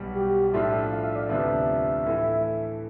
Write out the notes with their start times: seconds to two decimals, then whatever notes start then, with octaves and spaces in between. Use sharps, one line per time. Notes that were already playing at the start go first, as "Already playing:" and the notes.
Already playing: B1 B2 G3
0.15 G4
0.53 A2 F3 A3 D4 F4 E5
0.91 F5
1.04 E5
1.16 D5
1.29 D2 C3 F3 B3 D4 E5
2.05 A2 E3 A3 E4